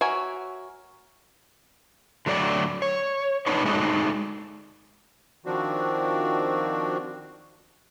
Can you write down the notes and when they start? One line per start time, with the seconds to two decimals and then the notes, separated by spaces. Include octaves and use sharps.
0.01 F#4 A#4 C#5 E5 G#5
2.26 D3 F#3 A3 D5
2.82 C#5
3.46 D4 D#4 B4 C#5
3.65 G#3 A3 D4 D#4 F#4 A4
5.46 D#3 F3 C4 D4 F#4